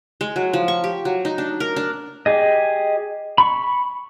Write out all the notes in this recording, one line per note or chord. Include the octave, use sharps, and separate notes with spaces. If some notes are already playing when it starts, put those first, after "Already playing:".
G#3
F#3
F3
C#6
G4
F#3
D#4
D4
A#4
D4
G4 G#4 D#5
B5 C#6